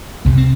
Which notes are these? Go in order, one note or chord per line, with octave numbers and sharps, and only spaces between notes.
C2 C3 A#3
C4